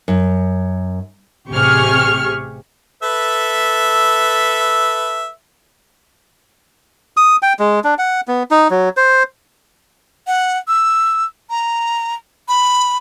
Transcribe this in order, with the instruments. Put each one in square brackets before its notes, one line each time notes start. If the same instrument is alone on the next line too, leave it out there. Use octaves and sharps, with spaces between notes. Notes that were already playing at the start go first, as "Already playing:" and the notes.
[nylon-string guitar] F#2
[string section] A1 C3 G4 G#4 C#6 F6
[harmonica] A4 B4 E5
[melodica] D#6
G5
G#3
D4
F#5
B3
D#4
F#3
C5
[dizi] F#5
E6
A#5
B5